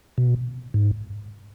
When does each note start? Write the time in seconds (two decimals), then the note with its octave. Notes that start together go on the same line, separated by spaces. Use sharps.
0.18 B2
0.74 G#2